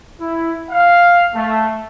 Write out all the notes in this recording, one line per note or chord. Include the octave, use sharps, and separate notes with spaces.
E4
F5
A3